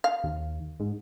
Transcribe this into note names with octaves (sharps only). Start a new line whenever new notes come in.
F5
D#2
G#2